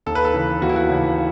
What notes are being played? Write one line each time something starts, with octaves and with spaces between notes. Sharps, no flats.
D#2 A4
B4
A4
C#3 E3
D#2 F#4
E4
F#4
C#3 E3